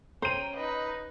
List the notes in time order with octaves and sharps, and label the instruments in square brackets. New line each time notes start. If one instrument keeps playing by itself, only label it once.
[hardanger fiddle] C#4 G5 [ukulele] C5 [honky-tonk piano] A#5 D#7
[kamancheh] D#4 D#5 [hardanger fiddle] B4